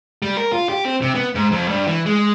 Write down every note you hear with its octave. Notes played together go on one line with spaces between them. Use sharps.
G3
A#4
F4
G4
C4
C3
B3
G#2
F2
G2
E3
G#3